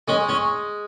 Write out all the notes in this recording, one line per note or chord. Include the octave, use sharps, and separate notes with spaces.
G#3 C#4
C#4